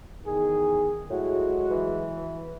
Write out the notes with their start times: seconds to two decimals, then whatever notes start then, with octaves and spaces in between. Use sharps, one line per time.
0.25 E2 D#3 G#4
1.10 A2 F#3 G#3 F#4
1.71 E3